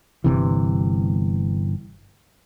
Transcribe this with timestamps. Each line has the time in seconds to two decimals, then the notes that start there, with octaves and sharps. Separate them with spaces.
0.24 G1 C#2 C3 E3